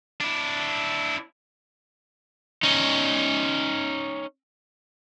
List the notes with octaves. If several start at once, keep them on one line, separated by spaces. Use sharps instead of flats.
D4 E4
C#4 D#4